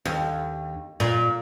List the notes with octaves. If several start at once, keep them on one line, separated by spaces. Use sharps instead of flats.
D#2
A#2